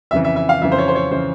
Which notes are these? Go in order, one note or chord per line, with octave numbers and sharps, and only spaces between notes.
F2 C#3 E3 E5
E5
E5
F5
F2 C#3 E3 E5
C5
C#5
C5
C#5
C#3 E3 C5